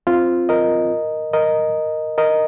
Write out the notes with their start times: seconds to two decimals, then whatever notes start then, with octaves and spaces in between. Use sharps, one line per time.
0.07 C4 F4
0.49 A#4 D#5
1.33 A#4 D#5
2.18 A#4 D#5